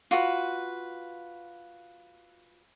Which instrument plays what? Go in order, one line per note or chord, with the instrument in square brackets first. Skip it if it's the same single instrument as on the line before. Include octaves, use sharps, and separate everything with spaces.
[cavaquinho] F4 F#4 B4